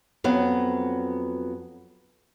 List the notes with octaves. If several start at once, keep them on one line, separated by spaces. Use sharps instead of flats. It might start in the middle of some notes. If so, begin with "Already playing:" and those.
F2 F#3 B3